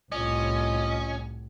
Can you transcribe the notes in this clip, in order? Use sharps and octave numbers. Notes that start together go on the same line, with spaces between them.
C2 A2 C#4 F4 D#5